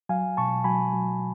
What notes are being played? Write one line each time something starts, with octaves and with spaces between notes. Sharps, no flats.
F#3 F5 G#5
B2 A5 C#6
F#3 G#5 B5
F#3